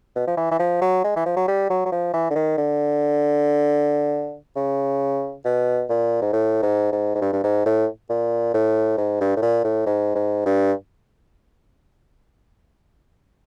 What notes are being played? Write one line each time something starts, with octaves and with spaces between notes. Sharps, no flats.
B2
F3
E3
E3
F3
F#3
G#3
E3
F3
F#3
G3
F#3
F#3
F3
E3
D3
D#3
D3
C#3
B2
A#2
G#2
A2
G#2
G#2
G#2
G2
G2
G#2
A2
A#2
A2
G#2
G2
A2
A#2
A2
G#2
G#2
G2